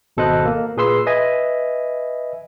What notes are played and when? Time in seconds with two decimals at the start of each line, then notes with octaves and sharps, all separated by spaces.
0.17 G#1 B2 A4 C5 D#5 F#6
0.45 A#3
0.77 A#2 G#4 B4 C6 E6 C7
1.06 B4 D#5 E5 G#5